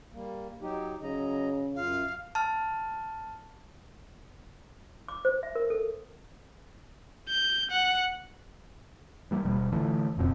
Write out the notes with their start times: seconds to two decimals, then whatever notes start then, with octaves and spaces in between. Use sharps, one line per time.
0.13 G3 A#3
0.61 F#3 D#4 G4
1.02 C#3 F#3 D#5 A#5
1.76 F#2 F4 F5
2.35 A5 F6
5.08 D6
5.25 C5
5.43 E5
5.55 A#4
5.70 A4
7.29 G6
7.71 F#5
9.31 E3 G3 A#3
9.45 D#1 B2 G3
9.72 A#2 D3 E3 A3
10.17 D1 F2 B2 C4